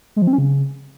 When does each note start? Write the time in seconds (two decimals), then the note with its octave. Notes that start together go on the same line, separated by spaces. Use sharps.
0.16 G#3
0.22 F3
0.27 C4
0.33 C#4
0.38 C#3